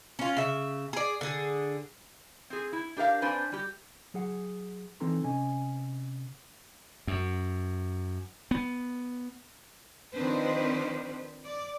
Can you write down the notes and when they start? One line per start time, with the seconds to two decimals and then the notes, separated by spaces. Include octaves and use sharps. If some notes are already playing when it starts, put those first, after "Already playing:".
0.19 C#4 F4
0.37 C#3 E5
0.93 G#4 D5
1.21 D3 G#4
2.50 C4 G#4
2.73 E4
2.97 D4 G4 A#4 E5 F5
3.22 C4 D4 B4 C5 G#5
3.52 G3 G4
4.14 F#3 G#4 F#5
5.00 E3 C4 D#4 A4 A#5 C6
5.24 C3 C#4 D#5 G#5
7.07 F#2
8.51 B3
10.13 D#3 F3 C4 D4 B4 C5
11.44 D5